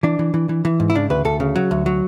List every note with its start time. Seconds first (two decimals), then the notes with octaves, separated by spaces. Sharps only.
0.03 E3 D4
0.19 E3
0.34 E3
0.49 E3
0.65 E3
0.80 G#2
0.90 E4
0.95 C#3 D4
1.10 D2 B4
1.25 D2 A4
1.40 C#3
1.56 F#3
1.71 D2
1.86 F#3